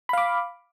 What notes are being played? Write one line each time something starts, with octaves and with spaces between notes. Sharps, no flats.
F5 B5 D6